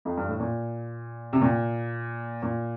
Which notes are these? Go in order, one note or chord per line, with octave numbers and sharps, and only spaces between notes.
F2
G2
A2
A#2
C3
A#2
A#2